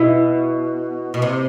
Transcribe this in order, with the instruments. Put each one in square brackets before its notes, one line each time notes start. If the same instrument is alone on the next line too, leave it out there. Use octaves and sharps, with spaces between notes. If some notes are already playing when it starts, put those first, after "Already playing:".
Already playing: [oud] B2 [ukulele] E4
[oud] B2
C3